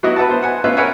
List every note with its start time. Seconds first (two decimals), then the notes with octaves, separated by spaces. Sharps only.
0.03 F#3 B3 E4 F#4 D#5
0.16 B4 E5 F#5 A5
0.30 B3 C5
0.42 F#5 G#5
0.64 B3 C#4 F4 B4 E5
0.77 A#4 B4 C#5 E5 F#5 G#5